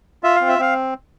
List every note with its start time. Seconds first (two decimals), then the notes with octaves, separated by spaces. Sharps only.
0.23 F4 E5
0.36 F5
0.41 C4
0.48 E5
0.59 C4 F5